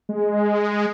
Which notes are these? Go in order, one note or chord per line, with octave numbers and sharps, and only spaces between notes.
G#3